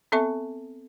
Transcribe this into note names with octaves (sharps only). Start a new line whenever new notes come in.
B3 C4 A4 E5 C#6